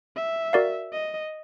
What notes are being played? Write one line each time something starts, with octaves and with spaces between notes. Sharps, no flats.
E5
F#4 A#4 D5 F5
D#5